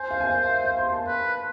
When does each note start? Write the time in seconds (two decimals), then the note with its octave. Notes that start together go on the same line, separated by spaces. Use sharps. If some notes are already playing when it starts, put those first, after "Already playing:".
Already playing: C5 G#5
0.11 F5
0.21 G#5
0.30 F5
0.49 E5
0.64 F5
0.78 C6
0.93 A5
1.07 B4